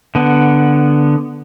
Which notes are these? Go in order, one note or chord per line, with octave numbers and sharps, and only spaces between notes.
D3 B3